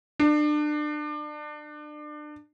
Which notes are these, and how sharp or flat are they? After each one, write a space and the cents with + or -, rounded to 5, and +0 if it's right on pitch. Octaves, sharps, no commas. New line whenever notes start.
D4 +30